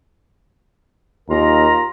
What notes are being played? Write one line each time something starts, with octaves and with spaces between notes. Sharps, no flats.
D#2 F4 A#4 A#5